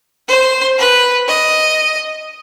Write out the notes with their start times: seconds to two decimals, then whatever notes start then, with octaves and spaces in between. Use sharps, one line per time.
0.28 C5
0.78 B4
1.27 D#5